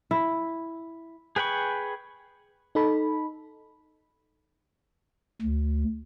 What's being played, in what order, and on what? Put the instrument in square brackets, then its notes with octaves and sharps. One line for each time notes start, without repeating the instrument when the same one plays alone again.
[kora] E4
[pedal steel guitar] G#4 B4 G5 B5 C#6
[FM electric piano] D#4 A4 B5
[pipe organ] D2